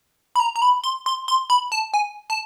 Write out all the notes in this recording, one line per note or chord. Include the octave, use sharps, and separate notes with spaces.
B5
A#5
A#5
B5
C6
C6
C6
B5
A5
G#5
A5